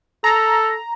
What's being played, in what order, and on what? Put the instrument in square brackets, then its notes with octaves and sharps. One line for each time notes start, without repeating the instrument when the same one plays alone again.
[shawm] A4 [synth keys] A#5